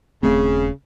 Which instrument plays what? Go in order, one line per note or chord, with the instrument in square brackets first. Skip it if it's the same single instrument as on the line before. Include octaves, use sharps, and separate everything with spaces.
[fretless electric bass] D#1 A3 C4 [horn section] C#3